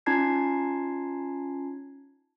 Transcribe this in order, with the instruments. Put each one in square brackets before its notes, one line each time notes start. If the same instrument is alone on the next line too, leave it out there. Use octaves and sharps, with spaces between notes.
[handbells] C#4 D#4 F4 A5 G#6 C7